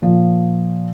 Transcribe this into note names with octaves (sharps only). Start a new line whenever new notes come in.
A#2 F3